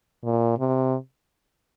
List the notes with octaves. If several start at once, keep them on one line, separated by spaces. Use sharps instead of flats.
A#2
C3